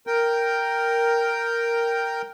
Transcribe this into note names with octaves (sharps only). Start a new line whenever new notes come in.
A#4 G5